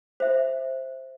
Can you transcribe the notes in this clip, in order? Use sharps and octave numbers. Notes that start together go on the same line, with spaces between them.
C5 E5